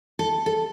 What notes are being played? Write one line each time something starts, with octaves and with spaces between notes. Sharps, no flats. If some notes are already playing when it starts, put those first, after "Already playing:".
A4
A4